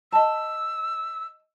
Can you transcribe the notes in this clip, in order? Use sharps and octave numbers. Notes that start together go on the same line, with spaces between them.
D#5 A5 E6